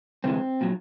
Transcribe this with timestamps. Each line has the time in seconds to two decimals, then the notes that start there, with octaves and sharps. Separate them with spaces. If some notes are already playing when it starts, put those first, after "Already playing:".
0.24 D2 C3 E3 G#3 C4
0.61 A#2 F#3